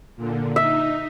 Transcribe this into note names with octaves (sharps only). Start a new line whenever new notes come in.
A#2 D3
D#4 E5